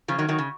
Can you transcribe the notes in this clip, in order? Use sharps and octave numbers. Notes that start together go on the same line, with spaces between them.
C#3 F3
D#3 F#3
D#3 F#3
C#3